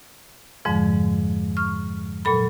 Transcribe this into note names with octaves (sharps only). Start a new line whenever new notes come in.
F2 G#2 D3 F3 G#3
C#6 F6
A#2 F#3 A4 B5